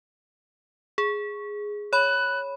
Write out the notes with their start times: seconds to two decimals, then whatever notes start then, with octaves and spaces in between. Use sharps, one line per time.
0.98 G#4
1.93 C#5 B5 F#6